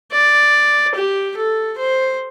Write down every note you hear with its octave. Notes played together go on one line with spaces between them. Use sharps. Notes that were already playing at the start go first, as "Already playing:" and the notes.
D5
G4
A4
C5